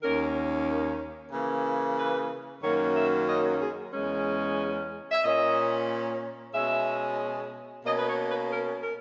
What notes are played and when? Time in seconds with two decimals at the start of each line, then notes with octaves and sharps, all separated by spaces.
0.02 D#2 D#3 A#3 C#4 A#4
1.32 C#3 E3 A#3
1.97 B4
2.63 F#2 D#3 F#3 A#3 C#4 C#5
2.96 E5
3.28 D#5
3.61 G#4
3.93 E2 C#3 G#3 C#4
5.11 E5
5.24 A#2 A#3 C#4 D#5
6.54 B2 G#3 C#4 E5
7.85 B2 A#3 C#4 D#5
7.97 B4
8.07 C#5
8.28 B4
8.50 A#4
8.82 A#4